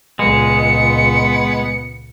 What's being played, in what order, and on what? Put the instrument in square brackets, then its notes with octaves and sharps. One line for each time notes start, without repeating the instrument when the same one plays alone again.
[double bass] C#2 A#2 [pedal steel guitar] G#3 [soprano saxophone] B3 [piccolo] C#7